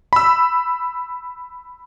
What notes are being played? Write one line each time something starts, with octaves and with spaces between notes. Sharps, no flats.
B5 E6